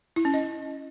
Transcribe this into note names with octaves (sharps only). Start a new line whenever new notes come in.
E4
C#4
D#5